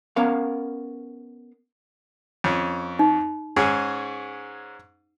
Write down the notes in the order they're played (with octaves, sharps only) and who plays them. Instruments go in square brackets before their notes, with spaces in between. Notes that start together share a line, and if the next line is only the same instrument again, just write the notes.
[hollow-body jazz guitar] B3 C#4 A#4 F5
[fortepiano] F2 C#4
[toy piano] D#4
[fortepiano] G#2 C#4 G#4